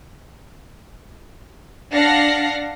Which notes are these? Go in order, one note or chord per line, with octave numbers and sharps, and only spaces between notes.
D4 F5 F#5 A#6 C7